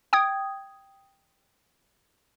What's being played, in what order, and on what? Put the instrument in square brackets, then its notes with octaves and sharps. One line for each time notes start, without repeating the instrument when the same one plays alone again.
[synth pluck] G5 D#6 G#6